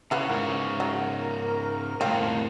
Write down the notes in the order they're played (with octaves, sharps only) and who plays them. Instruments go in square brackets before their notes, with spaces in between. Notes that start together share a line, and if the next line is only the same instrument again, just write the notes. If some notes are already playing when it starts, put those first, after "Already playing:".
[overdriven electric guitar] C#3 [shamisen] E4 B4 F#5 [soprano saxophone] F5
[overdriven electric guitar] G#2 C#3 [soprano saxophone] A#4
[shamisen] F#3
[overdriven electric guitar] F2 A2 [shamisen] C4 F5